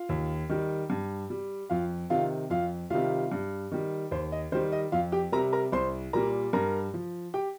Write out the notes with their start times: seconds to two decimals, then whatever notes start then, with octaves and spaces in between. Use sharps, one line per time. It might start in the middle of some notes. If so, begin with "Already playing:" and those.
Already playing: F4 F5
0.09 D#2
0.49 D#3 G3
0.90 G2
1.30 G3
1.70 F2 F4 F5
2.10 C3 D#3 F4 F5
2.50 F2 F4 F5
2.90 C3 D#3 G3 F4 F5
3.31 G2
3.72 D#3 G3
4.11 D#2 C5
4.32 D#5
4.52 D#3 G3 C5
4.72 D#5
4.92 F2 F4 F5
5.12 G4 G5
5.32 C3 G3 A#4 A#5
5.53 A#4 A#5
5.72 C2 C5 C6
6.13 A#2 G3 A#4 A#5
6.53 G2 A#4 A#5
6.94 F3
7.34 G4 G5